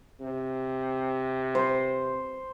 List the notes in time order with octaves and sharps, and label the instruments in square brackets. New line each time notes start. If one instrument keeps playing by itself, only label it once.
[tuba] C3
[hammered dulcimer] C5